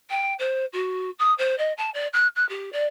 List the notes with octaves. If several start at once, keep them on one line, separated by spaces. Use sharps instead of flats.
G5
C5
F#4
D#6
C5
D#5
A5
D5
F#6
F#6
G4
D5